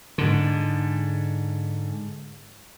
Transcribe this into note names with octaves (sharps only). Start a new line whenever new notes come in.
G#2 D3